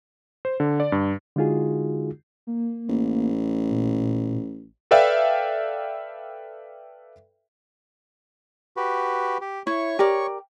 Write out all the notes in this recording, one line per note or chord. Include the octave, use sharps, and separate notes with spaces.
C5
D3
D5
G2
D3 G#3 D#4 F4 F#4 G#4
A#3
A1
A#2
A4 B4 D5 E5 F5 G5
F#4 G4 B4
G4
E4 C#5 C#6
G4 A#4 D5